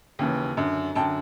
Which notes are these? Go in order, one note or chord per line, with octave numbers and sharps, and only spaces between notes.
D#2 C#3 E3
F#2 D3
F#2 D3 G5 A5